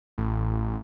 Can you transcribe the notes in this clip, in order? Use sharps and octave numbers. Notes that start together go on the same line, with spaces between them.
A1